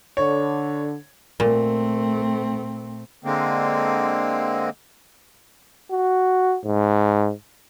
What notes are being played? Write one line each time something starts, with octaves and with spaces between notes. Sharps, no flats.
D3 C#5
A#2 A3 C4
D3 G#3 A#3 C4
F#4
G#2